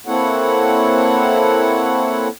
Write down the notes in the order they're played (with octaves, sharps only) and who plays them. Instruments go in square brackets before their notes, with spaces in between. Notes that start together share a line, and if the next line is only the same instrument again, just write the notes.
[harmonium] A#3 C4 E4 A4 C#5 F#5